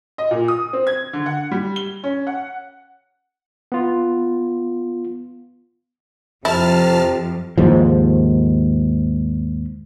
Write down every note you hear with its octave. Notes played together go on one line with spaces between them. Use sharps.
D#5
A#2
D#6
C4
G#6
D3
F#5
G3
G7
C#4
F#5
B3 F4
F2 C3 E4 A5 F6
D#2 G#2 F3